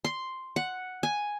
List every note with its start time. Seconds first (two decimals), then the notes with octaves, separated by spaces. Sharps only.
0.05 C6
0.56 F#5
1.03 G#5